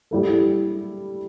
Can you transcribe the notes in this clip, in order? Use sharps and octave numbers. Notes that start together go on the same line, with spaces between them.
G3 E4 A4